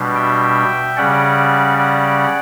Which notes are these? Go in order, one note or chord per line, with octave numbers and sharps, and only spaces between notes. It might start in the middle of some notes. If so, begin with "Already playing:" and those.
Already playing: B2 G3 D4
E5 G5
C#3 G3 C#4 D5 F#5
D5 F#5